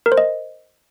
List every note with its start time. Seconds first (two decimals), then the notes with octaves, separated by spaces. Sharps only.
0.06 A#4
0.12 C5
0.17 D#5